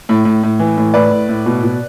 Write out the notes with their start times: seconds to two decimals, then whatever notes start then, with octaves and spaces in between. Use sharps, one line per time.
0.09 A2
0.25 A2
0.43 A2
0.59 E3
0.77 A2
0.94 A2 B4 D5
1.11 A2
1.29 A2
1.46 B2
1.63 B2